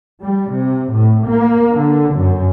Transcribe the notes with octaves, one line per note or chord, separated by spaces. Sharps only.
G3
C3
A2
A#3
D3
F#2